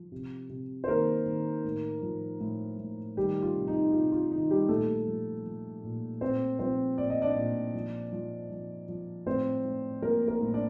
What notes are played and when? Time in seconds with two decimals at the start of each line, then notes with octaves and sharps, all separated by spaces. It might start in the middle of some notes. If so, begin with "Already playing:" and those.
Already playing: F3
0.12 C3
0.50 C3
0.84 C5
0.88 D#3 A#3 A#4
1.26 D#3
1.65 A2
2.02 F3
2.40 A2
2.78 A2
3.17 D#3 G3 G4
3.42 F4
3.55 C3
3.68 D#4
3.93 C3 F4
4.12 F4
4.31 D#3 D#4
4.50 G3 G4
4.69 A#2 A3 A4
5.08 F3
5.45 F3
5.84 A#2
6.21 A#2 C4 C5
6.59 F3 C4 C5
6.98 A#2 D5
7.10 D#5
7.22 D4 D5
7.36 A#2
7.74 F3
8.12 F3
8.50 F3
8.89 F3
9.26 A2 C4 C5
9.64 A2
10.02 F3 A#3 A#4
10.28 A#3 A#4
10.41 A2
10.53 D4 D5